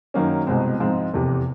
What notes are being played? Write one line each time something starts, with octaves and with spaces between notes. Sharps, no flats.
F#2 D#3 F#3 A#3 C#4
C2 B2 G#3 C4
G#2 F3 G#3 C4
F1 E2 C3